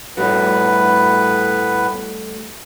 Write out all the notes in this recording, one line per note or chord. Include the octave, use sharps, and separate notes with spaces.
A2 G3 A3 B3 F#4 B4